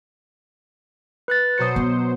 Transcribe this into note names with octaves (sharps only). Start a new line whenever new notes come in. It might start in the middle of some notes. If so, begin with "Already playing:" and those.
B4 F#6 A6
B2 F#3 C5 D#6 C#7
B3